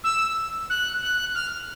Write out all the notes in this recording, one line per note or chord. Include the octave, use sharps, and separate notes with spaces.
E6
F#6
F#6
F6